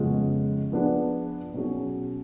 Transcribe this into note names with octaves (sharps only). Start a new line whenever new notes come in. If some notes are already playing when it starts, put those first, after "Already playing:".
Already playing: F2 C#3 G#3 B3 F4
F3 B3 D4 G#4 B4
B2 F#3 C#4 G#4